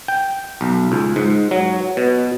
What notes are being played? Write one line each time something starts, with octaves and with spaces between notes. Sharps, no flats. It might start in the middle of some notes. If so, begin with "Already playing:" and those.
G5
B1
C#2
G#2
F#3
B2